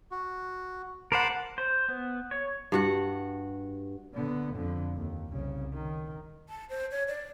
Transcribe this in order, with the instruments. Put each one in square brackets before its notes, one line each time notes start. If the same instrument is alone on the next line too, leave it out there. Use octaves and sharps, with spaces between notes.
[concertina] F#4
[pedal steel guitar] A#4 C5 F#5 [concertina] A5 B5 D6
[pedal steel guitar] C5
B3
C#5
[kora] G2 F#4 F#5
[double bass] D3 B3
F2 D3
D#2
C2 C#3
D#3
[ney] A5
C5
C#5
D5